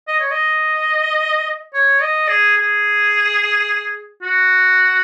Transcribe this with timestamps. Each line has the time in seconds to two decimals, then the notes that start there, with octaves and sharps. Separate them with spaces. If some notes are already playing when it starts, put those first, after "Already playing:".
0.08 D#5
0.20 C#5
0.31 D#5
1.74 C#5
2.02 D#5
2.29 G#4
2.57 G#4
4.22 F#4